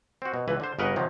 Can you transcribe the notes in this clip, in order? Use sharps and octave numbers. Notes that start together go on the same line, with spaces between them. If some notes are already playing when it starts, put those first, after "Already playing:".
C4 F#4
B2
C#2 E3 B4
D3 C5
G1 C#3 A#4 B4 D#5 F#5
C3 D#3 F3 F#3